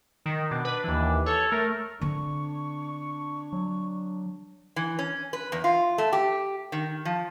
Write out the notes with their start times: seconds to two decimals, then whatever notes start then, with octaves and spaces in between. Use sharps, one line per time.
0.26 D#3
0.51 B2 D4
0.65 B4
0.84 D#2 E3
1.26 A4 C#5
1.52 A3 A#4
2.01 D3 C4 D4 C#6
3.53 F#3
4.76 E3
4.99 C#4
5.33 B4
5.52 E2
5.64 F4
5.98 A3
6.13 G4
6.72 D#3
7.05 F3